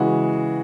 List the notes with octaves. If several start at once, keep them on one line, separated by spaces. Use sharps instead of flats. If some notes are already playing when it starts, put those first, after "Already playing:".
Already playing: C#3 E3 G#3 F#4